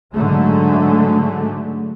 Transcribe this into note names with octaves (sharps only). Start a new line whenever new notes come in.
G#2 D3 F#3 G#3 A3